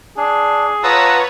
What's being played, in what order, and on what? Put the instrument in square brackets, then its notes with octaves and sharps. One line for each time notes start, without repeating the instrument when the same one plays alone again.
[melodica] D4 [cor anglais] G#4
[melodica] F4 F#5 A5 [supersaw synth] B4 C#5 [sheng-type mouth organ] A#5 D#6 E6